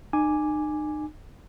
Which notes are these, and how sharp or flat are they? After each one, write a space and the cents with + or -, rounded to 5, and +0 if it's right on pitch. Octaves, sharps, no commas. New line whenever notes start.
D#4 -40 G#5 +0 D6 +0